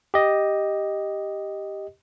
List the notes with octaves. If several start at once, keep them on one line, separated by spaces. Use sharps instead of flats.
G4 D#5